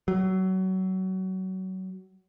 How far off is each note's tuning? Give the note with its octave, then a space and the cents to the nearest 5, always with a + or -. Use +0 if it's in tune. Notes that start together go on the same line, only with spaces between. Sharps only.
F#3 +25